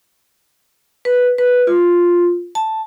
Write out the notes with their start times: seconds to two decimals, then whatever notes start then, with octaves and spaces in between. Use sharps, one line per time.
1.05 B4
1.38 B4
1.67 F4
2.55 A5